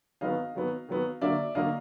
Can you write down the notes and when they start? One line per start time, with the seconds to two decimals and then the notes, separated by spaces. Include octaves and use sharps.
0.21 D#3 F#3 B3 D#5 F5
0.55 D#3 F#3 B3
0.89 D#3 F#3 B3
1.21 D3 F#3 A#3 D4 D5 E5
1.55 D3 F#3 A#3 D4 D#5 F5